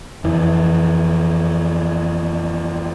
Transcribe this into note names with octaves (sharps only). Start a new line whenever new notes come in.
F2 E3